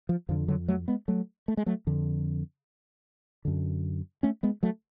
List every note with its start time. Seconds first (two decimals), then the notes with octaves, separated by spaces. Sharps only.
0.09 F3
0.29 F2 D3 F3
0.48 D3 F#3
0.68 F#3 A3
0.88 G#3 B3
1.08 F#3 A3
1.48 A3
1.57 G#3
1.66 F#3 A3
1.87 F2 D3
3.45 F#2 D3
4.23 A3 C#4
4.43 G#3 B3
4.63 F#3 A3